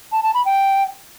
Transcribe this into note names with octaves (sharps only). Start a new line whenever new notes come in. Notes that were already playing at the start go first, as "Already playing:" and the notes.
A5
A5
B5
G5